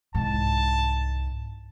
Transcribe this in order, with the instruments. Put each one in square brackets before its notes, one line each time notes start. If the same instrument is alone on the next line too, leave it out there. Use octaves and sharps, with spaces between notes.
[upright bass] C2 G#2 [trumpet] A5